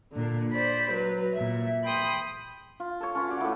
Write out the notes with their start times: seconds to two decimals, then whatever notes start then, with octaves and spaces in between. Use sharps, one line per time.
0.13 A#2 D3
0.52 C5 D5 B5
0.92 F#3 B4
1.34 A#2 E5
1.83 G5 B5 C6 D#6
2.80 F4
3.00 A4 C#5
3.15 C#4 F4 B4
3.28 F#4 D5 D6
3.41 A2 E4